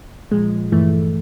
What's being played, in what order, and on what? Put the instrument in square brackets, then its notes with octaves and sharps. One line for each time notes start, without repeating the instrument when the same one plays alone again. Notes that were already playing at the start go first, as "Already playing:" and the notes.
[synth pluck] A#2 F3 G#3
G2 E3 A3